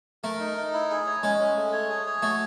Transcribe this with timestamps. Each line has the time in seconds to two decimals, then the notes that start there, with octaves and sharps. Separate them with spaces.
0.24 A3 A#4
0.40 D#4
0.57 D#4
0.73 E4
0.90 G#4
1.06 C#5
1.23 G#3 C#4
1.39 C#4
1.57 A3
1.72 C#5
1.89 G#4
2.06 C#5
2.22 A3 F#4